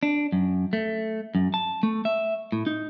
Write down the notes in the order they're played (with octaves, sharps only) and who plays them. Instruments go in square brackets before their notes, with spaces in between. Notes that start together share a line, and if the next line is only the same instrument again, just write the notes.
[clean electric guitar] D4
F#2
A3
F#2
A5
A3
E5
A2
D#4